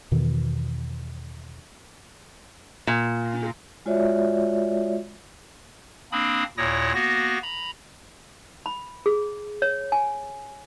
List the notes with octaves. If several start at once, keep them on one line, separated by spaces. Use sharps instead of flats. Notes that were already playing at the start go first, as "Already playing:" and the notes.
E2 B2 D#3 E3
A#2
G#3 F4 F#4 C#5 D5 E5
A#3 C4 D4 B5 D#6
D#2 A#2 E4 C#5 D#6 A#6
A#3 B3 F#4 A#6
A#5 B5
B5
G#4
C#5
G#5